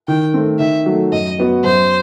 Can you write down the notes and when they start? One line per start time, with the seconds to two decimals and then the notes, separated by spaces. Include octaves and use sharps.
0.08 D#3 G5
0.34 A3 C4
0.60 D#3 E5
0.86 F#3 A3
1.12 F#2 D#5
1.39 F#3 B3 F#4
1.64 F#2 C5